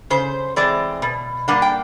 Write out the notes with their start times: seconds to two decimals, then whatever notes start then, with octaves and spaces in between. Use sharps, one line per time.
0.10 C#3 C5
0.56 E3 G#3 C4 D5
1.02 B2
1.48 G3 A#3 D4 F#5
1.62 G5